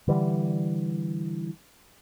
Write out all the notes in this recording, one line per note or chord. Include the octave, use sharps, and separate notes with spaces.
D3 E3 G3